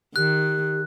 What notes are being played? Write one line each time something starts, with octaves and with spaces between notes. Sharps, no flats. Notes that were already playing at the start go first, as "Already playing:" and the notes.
D#3 G4 F#6